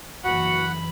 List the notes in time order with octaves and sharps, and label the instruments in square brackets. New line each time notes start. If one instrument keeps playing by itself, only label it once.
[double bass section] F#1 E3 [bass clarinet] F#4 [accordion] F#5 [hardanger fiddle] B5